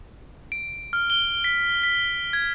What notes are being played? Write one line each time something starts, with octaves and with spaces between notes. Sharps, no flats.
D7
F6
G7
B6
B6
G#6